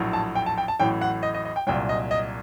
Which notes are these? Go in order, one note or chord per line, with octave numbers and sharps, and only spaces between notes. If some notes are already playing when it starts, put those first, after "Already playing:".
Already playing: A#1 A2 F#3
A5
G5
A5
G5
A5
A1 A2 F#3 G5
F#5
D#5
D#5
D#5
G5
C2 A#2 F#3 G5
D#5
D#5